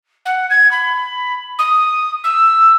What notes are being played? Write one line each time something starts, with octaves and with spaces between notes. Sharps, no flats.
F#5
G#6
B5
D#6
E6